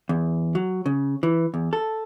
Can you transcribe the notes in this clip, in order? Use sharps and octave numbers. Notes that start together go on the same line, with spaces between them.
E2
F#3
C#3
E3
E2
A4